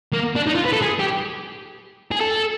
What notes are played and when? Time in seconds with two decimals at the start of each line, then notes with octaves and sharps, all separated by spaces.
0.13 A#3
0.36 D4
0.47 D#4
0.56 F4
0.66 B4
0.73 A4
0.82 G#4
1.00 G4
2.12 G#4
2.21 A4